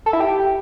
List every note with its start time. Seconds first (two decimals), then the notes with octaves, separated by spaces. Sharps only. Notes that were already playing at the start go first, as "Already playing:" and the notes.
0.06 A4
0.13 E4
0.20 G4